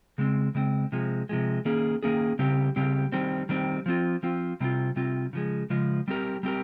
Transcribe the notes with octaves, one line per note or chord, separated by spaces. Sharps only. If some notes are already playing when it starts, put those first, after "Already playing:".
C#3 G#3 C4
C#3 G#3 C4
C3 F3 G#3
C3 F3 G#3
D#3 A#3 C#4 G#4
D#3 A#3 C#4 G#4
C#3 G3 C4 G4
C#3 G3 C4 G4
D#3 G3 C4
D#3 G3 C4
F3 C4 F4
F3 C4 F4
C3 G3 C4 F4
C3 G3 C4 F4
C#3 F3 G#3
C#3 F3 G#3
G3 C4 G4 A#4
G3 C4 G4 A#4